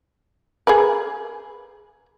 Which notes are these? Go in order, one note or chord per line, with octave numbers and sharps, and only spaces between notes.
G#4 A#4 B4